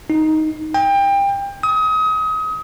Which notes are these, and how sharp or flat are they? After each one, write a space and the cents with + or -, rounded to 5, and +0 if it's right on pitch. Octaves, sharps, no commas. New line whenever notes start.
D#4 +5
G5 +25
D#6 +30